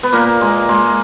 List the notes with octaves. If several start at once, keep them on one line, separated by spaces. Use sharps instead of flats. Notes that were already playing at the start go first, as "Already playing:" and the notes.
B3
A#2 A#3
G#3
G#3